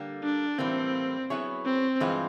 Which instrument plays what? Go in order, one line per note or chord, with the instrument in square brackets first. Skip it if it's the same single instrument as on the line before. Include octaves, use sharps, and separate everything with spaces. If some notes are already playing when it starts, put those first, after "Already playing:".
Already playing: [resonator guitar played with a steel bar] D3 G3 A#3
[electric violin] D4
[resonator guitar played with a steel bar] A2 E3 G3 A#3 [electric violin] C4
[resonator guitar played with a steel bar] F#3 B3 E4 G#4 C#5
[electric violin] C4
[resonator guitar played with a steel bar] G2 E3 G#3 C4 F4